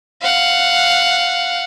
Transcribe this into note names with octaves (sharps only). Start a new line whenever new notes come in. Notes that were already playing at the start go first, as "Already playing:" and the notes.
F5 F#5